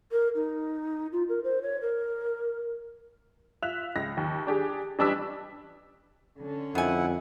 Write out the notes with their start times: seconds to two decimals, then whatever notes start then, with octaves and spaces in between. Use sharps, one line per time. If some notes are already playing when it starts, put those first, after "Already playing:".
0.12 A#4
0.35 D#4
1.12 F4
1.29 A#4
1.44 C5
1.62 C#5
1.81 A#4
3.62 F4 E5 F#6 F7
3.96 C#2 A#6
4.17 D#2
4.47 D4 G4 G#4
4.99 A1 G3 D4 B4 E6 B6
6.39 D3 C#4
6.75 F2 D#3 E4 F#5 G#5